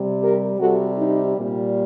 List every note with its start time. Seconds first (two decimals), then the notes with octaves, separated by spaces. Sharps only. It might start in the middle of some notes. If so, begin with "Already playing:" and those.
Already playing: C3 G3
0.21 G4 A#4
0.60 C3 G3 F#4 A4
0.98 D#4 G4
1.37 A#2 G3